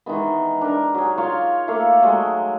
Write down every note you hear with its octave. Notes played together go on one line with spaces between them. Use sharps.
D#3 E3 G#3 B3
D4 A#4
F#3 G#4
F4 C#5 F5 C6
A3 A#3 A4 F5
F#3 G#3 A3 G#4